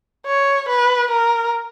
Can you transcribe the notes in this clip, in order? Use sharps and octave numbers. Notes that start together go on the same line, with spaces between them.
C#5
B4
A#4